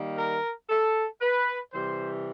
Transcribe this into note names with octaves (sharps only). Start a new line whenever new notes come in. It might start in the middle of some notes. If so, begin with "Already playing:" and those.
Already playing: D#3 G3 A#3
A#4
A4
B4
C3 E3 G3 C5